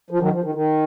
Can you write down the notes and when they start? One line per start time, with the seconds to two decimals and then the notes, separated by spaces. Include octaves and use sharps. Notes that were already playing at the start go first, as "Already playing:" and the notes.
0.10 F3
0.21 D#3 F#3
0.32 F3
0.44 D#3
0.55 D#3